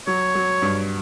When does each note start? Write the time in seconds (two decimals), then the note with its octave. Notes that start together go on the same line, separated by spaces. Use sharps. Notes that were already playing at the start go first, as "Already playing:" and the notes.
0.07 F#3 C#5
0.35 F#3
0.62 G2